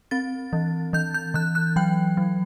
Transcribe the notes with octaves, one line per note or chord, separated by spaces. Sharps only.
C4 A6
E3
E3 G6
G6
E3 F#6
F#6
F#3 G5
F#3